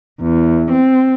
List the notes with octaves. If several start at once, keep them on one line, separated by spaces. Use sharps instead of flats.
E2
C4